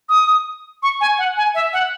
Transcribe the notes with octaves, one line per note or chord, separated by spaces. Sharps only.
D#6
C#6
G#5
F#5
G#5
E5
F#5